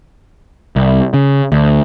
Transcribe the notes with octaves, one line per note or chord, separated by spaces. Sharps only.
C2
C#3
D2